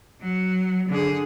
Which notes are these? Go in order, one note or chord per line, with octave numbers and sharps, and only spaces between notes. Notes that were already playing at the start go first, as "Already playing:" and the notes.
F#3
D3 G#4